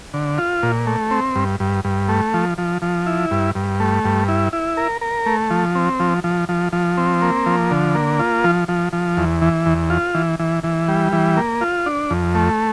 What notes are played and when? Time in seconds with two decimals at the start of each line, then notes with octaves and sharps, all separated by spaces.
0.14 D3
0.38 F4
0.63 A#2
0.86 A3
1.11 C4
1.36 G2
1.60 G2
1.85 G2
2.09 A3
2.34 F3
2.58 F3
2.82 F3
3.06 E4
3.31 G2
3.55 G2
3.80 A3
4.05 G2
4.28 E4
4.53 E4
4.77 A#4
5.01 A#4
5.26 A3
5.50 F3
5.75 C4
6.00 F3
6.24 F3
6.49 F3
6.73 F3
6.97 C4
7.22 A#3
7.46 F3
7.71 D3
7.95 A#3
8.19 F4
8.44 F3
8.68 F3
8.93 F3
9.17 E2
9.42 E3
9.66 E2
9.90 F4
10.15 E3
10.39 E3
10.64 E3
10.88 G3
11.12 E3
11.37 A#3
11.61 F4
11.86 D4
12.10 F2
12.35 A3